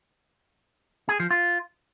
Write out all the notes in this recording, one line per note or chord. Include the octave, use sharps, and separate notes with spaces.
G#4
F3
F4